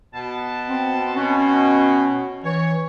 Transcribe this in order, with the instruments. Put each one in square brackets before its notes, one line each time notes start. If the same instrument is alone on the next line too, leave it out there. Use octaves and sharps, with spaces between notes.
[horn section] B2 A5
[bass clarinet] C4
[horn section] B2 [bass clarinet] C#4
[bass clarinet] E3 [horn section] C#5